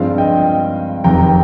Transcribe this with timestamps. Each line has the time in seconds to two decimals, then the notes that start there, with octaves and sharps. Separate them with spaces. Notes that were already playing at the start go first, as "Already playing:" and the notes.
Already playing: G2 F3 G#3 C4 F5
0.18 D#5 G5
1.04 F1 F2 D#3 G5 A#5